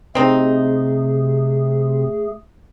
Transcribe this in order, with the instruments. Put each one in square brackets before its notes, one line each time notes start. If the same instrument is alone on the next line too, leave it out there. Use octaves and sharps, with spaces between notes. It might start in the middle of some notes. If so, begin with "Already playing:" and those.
[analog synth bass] C3 [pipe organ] A3 G#4 [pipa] C4 D#4